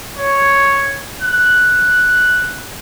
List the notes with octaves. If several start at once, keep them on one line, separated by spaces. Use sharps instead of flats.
C#5
F#6